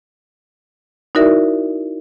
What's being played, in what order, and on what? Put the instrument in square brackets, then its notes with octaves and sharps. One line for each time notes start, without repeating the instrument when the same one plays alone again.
[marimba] D#4 E4 F#4 A#4 D5 E5